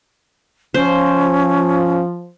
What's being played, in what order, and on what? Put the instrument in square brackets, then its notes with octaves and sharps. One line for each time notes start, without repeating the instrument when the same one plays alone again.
[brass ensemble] F3 [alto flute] C#4 [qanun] C5